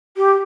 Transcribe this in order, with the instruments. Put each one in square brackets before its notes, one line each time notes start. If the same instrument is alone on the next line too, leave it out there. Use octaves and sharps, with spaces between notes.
[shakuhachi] G4